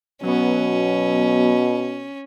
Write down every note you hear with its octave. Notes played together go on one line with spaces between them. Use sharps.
B2 F#3 B3 C#4